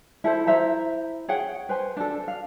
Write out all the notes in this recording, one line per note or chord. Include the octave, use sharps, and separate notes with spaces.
E4 A4 C5
E4 C5 E5 A#5
G#4 C#5 F#5 G5
B4 C5 G#5
D4 A4
F5